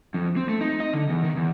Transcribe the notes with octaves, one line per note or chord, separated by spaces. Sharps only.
F2
C4
A3
D#4
D#5
D3
E2
D#3
E2